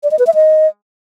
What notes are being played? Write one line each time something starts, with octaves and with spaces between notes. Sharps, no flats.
D5
D#5
B4
E5
D#5